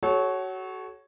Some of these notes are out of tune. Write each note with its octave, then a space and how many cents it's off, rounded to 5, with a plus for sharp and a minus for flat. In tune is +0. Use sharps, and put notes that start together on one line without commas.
F#4 +25 A4 -35 C#5 +0